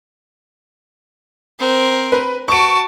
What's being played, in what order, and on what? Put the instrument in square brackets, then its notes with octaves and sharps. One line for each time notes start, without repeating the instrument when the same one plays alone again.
[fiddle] C4 A#4
[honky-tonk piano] B4
[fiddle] F#4 A5 [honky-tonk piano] C#6 D7